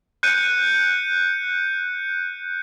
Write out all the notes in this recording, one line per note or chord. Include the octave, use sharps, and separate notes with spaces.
F#6 G6 C#7 D#7